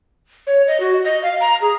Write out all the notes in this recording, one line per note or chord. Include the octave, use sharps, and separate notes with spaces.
C#5
D#5
F#4
D#5
F5
A#5
G#4